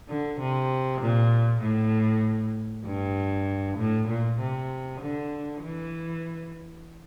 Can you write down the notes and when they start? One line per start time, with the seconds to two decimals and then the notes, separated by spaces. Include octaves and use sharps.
0.08 D3
0.40 C3
1.01 A#2
1.62 A2
2.86 G2
3.78 A2
4.08 A#2
4.39 C3
5.00 D3
5.62 E3